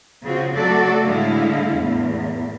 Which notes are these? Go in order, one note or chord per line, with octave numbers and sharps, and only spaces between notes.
C#3 C4 F4 F#4
F#3 A3 F#4 A4 D5
A2 D3 G#3 E4 F5
E2 A2